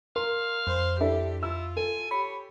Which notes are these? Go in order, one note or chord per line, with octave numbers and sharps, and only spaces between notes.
A#4 F5 C6
F2 C5
D4 E4 G4 A4
E4 F4 E6
A4 G#5
G4 C#5 B5